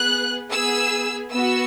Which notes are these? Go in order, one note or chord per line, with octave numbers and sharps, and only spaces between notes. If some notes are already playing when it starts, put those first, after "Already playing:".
Already playing: B3 G#4 F#6
B3 G#4 E6
B3 F#4 E6